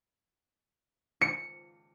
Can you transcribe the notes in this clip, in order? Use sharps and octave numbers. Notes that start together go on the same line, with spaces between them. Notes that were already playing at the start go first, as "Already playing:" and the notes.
C#7